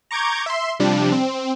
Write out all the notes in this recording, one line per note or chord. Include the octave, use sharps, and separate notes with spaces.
A#5 C#6 D6 G6 G#6
E5 C6
C3 F3 G3 D4
C4